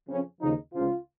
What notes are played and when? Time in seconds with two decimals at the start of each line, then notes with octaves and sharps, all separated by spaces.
0.08 F2 C#3 F3 C#4
0.41 D#2 C#3 F3 D#4
0.74 C#2 C#3 F3 F4